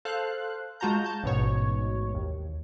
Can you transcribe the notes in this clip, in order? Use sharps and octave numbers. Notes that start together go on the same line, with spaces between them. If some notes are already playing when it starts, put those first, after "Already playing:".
A4 C5 F5 F#6
G#3 F4 F#4 A5 A#5 G6
A5 G6
A1 G#2 B2 C#5
D#2